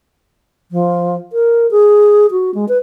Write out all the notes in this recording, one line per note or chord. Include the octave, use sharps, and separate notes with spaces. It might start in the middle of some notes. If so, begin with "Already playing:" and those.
F3
A#4
G#4
F#4
G#3
B4